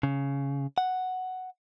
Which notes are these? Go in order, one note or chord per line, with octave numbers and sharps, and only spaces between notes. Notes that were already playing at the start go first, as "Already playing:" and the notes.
C#3
F#5